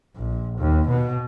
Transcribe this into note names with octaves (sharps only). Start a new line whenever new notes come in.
A#1
D#2
B2